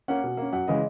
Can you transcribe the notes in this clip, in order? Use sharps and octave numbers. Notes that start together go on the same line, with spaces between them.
A#3 C#4 F#5
B2
A#3 C#4
F#2 F#5
C#3 E3 G#3 D#5